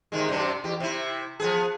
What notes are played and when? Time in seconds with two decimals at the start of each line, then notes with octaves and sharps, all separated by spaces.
0.12 C3 D#3 G#3
0.29 F#2 C3 D4
0.64 E2 G4
0.80 C3 E4
1.40 F3 B3 G#4